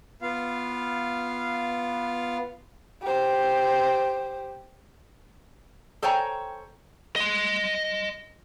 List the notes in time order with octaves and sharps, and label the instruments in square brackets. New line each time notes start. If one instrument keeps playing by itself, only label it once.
[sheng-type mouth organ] B3 F4 F5
[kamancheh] G4 C5
[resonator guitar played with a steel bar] A4 C5 C#5 G5 G#5 A#5
[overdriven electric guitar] D#5 C6